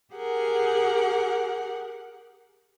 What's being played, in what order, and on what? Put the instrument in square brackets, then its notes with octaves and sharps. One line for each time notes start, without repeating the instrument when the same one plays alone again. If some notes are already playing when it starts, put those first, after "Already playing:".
[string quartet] G4 G#4 A#4 F#5